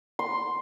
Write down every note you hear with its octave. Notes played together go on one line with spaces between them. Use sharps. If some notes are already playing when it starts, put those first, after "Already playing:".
C6